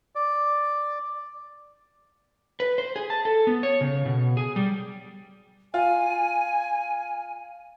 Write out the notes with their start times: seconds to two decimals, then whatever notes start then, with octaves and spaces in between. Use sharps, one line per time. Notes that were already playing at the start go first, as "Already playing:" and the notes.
0.15 D5
2.60 B4
2.78 C5
2.96 G#4
3.10 A5
3.25 A4
3.47 B3
3.63 C#5
3.81 C#3
4.06 B2
4.37 G#4
4.56 G3
5.74 F4 G#5